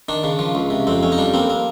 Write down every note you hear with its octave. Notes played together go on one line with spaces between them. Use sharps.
D#3 D4
C#3
F3
C#2
C3
F2 C4
F2 C#4
D#4
G3 D4
A#3 C4
A#3